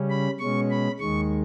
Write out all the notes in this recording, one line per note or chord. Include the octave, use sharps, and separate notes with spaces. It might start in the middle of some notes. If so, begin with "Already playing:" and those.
Already playing: C#3 G3 C#4
B5
B2 G#3 C#4 C#6
B5
D#2 D#3 G#3 C#6